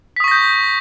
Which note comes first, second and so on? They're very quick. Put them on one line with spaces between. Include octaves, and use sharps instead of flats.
B6 D#6 C#6 A#6 G6